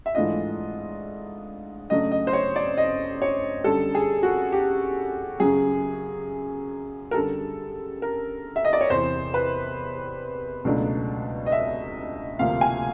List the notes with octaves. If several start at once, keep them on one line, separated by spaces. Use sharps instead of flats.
E5
G#2 E3 A3 D4 F4 D#5
F#2 C#3 F#3 A3 D4 D#5
D#5
C5
C#5
D5
D#5
C#5
F#2 D3 G3 A4
G#4
F#4
G4
F#2 C#3 F#3 G#4
A#4
F#2 D3 G3 A4
A#4
E5
D#5
D5
C#5
E2 C3 E3 C5
B4
C#2 B2 F#3 A3 D4
D#5
E5
D2 C3 F3 A#3 F5
G#5